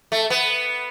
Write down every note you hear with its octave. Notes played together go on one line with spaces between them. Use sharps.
A3
B3